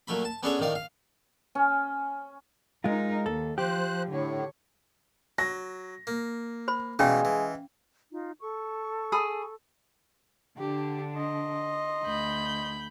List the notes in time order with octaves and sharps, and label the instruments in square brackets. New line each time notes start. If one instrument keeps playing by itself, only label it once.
[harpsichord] A#2 F#3 A3 B5
A5
B3 C#4 D4 G#4 A4 C#5
A2 D#3 D5 F5
F5
[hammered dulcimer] C#4
[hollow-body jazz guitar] G#3 F4 [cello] D#4 A#4
[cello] D#2 [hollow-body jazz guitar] A4
[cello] F3 [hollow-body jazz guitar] G4 [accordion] C5 F#6
[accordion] A2 [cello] D3 C#5
[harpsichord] F#3 [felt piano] A#6
[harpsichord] A#3
[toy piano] C5 B5
[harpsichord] B2 E3 G3 [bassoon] G#3 [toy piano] C#4 G5 [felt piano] F5
[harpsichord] E3
[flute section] D#4 F4
A4 C#6
[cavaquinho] G#4 B5 D#6
[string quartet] D3 D4 [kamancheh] G4
[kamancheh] D#5 C6
[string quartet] D2 B5 G6